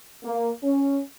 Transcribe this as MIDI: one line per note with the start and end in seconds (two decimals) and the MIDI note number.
0.24 0.49 58
0.63 0.99 61